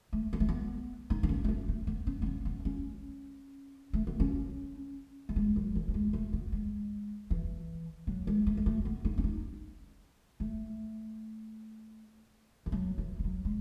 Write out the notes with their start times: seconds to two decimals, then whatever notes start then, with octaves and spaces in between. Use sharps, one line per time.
0.13 A3
0.33 B3
0.40 A3
0.49 B3
1.10 D#4
1.23 D#4
1.29 C#4
1.44 A3
1.48 B3
1.68 A3
1.87 B3
2.07 C#4
2.22 B3
2.26 C#4
2.45 B3
2.65 C#4
3.93 A3
4.07 B3
4.20 C#4
5.29 A3
5.36 G#3
5.56 F#3
5.75 E3
5.88 A3
5.94 G#3
6.13 A3
6.33 B3
6.52 G#3
7.31 E3
8.07 F#3
8.27 G#3
8.47 A3
8.57 G#3
8.66 A3
8.85 B3
9.05 D#4
9.18 C#4
9.24 D#4
10.40 A3
12.66 E3
12.72 F#3
12.98 E3
13.19 E3
13.24 F#3
13.45 G#3